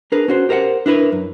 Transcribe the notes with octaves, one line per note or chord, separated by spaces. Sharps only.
D4 G#4 A#4 B4
C#4 F#4 C5
G4 A#4 C5 F5 F#5
D4 E4 A#4 B4
F#2